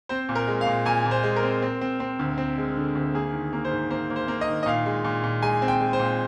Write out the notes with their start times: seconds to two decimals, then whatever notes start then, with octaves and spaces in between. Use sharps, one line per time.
0.09 C4 C5
0.29 A#2
0.35 A#4
0.48 G#3
0.61 F5
0.67 A#2
0.85 A#2 G#5
1.05 A#2
1.11 C5
1.23 G#3
1.36 A#4
1.43 C4
1.62 C4
1.81 C4
2.00 C4
2.19 D2
2.38 C4
2.58 G#3
2.77 D3
2.95 D2
3.14 A#3 G#4
3.33 D#3
3.53 A#3
3.65 C5
3.71 G#2
3.90 A#3 C5
4.10 A#3
4.16 C5
4.28 A#3
4.41 D#5
4.47 D#3
4.63 D#5
4.66 A#2 F5
4.86 G#3
5.04 A#2
5.24 A#2
5.42 G#3 G#5
5.62 C4
5.68 G5
5.80 G#3
5.93 C5
5.99 A#2